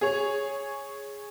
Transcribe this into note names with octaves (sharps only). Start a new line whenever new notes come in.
G#4 C#5